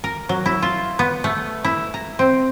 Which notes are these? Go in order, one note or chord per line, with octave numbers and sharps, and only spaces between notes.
A#4
F#3
E4
F4
B3
A3
E4
A#5
C4